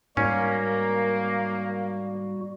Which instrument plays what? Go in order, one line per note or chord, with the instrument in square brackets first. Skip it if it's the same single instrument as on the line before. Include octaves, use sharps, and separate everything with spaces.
[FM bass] G#2 [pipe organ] G3 F#4 [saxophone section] A#3 [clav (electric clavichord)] C#4